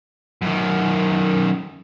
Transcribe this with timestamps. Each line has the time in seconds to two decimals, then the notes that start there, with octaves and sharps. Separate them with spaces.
0.42 F#2 D#3